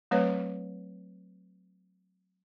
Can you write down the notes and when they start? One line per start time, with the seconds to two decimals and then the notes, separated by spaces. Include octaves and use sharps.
0.11 F#3 A3 C4 B4 C#5